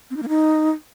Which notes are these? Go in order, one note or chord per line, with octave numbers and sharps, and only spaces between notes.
C4
D#4
A#3
D#4